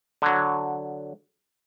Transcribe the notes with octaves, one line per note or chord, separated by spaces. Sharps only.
D3 F#3